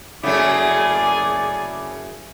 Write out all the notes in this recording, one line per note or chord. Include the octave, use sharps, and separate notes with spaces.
F#2 C#3 A3 E4 G#4 D5